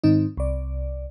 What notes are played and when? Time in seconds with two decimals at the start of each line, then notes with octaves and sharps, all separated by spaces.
0.04 G#2 D#3 C4 D#4
0.37 C2 D5